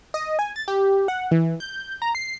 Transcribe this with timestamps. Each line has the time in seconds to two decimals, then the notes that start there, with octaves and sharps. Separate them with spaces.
0.14 D#5
0.39 G#5
0.56 A6
0.68 G4
1.08 F#5
1.31 E3
1.60 G6
2.02 A#5
2.15 C7